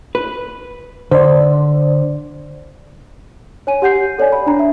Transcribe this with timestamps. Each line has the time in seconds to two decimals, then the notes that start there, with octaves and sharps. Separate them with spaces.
0.15 B4
1.11 D3 C5 D5
3.67 C#5 G#5 D#7
3.82 G4 F#5 G6 C7
4.18 A4 C#5 D5 G#5
4.32 B5
4.47 D4 A#5
4.59 E5